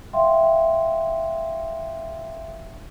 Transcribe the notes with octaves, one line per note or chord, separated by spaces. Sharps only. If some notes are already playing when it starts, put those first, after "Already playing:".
E5 F5 G5 C6